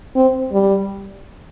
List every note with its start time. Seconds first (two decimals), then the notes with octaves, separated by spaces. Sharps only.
0.16 C4
0.52 G3